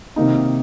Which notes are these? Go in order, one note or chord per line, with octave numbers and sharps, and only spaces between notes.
C3 D#3 A#3 D#4